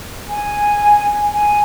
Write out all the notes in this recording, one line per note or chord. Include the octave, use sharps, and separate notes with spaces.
G#5
G#5